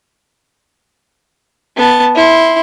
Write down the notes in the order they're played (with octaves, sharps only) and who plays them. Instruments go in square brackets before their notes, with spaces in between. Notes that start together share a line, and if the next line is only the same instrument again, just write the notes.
[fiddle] B3 A5
E4 C6